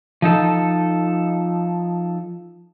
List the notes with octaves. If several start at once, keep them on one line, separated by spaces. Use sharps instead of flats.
F3 D#4 A4